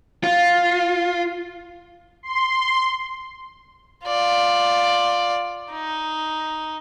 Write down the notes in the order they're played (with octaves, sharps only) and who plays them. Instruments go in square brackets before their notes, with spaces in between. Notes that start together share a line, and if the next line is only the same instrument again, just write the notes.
[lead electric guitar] F4
[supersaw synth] C6
[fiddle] F4 D5
D#4